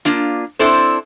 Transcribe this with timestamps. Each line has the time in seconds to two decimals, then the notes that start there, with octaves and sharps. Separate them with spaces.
0.05 A#3 D4 F4
0.59 C4 D4 E4 A4 C5